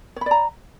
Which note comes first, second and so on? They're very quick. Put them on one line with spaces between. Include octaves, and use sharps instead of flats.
C#5 B5 D5 A#5